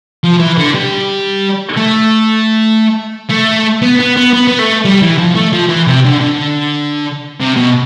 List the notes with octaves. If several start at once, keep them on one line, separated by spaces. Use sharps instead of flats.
F3
E3
D3
G3
A3
A3
B3
B3
B3
B3
B3
A3
G3
E3
F3
A3
F3
E3
C3
D3
D3
C3
B2